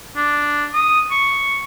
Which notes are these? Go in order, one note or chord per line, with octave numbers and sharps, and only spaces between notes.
D4
D#6
C#6